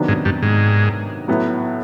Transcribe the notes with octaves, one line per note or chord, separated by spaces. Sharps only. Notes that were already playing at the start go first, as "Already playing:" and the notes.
Already playing: C3 D#3 F#3 B3 D4
G#2
G2
G#2
A2 F#3 B3 E4